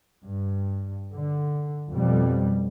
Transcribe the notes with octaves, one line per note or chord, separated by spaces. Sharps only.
G2
D3
F2 B2 G3